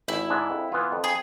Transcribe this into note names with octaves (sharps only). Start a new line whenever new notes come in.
G#1 E4
G#2 G#3 D4
F2
E3 B3 F4
F2
G#4